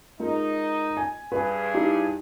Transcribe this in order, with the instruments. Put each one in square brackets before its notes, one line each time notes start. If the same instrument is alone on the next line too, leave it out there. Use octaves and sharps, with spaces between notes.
[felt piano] G#3 F4 A#4 [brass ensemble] D#4
[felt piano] G#5
[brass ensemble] G2 G#4 [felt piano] B4 G#5
[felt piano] D#4 E4 G4